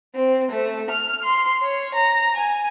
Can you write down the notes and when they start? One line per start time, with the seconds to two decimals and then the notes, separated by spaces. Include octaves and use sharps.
0.15 C4
0.52 A3
0.90 F6
1.24 C6
1.63 C#5
1.95 A#5
2.37 G#5